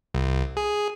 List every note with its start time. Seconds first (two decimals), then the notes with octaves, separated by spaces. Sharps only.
0.14 C2
0.57 G#4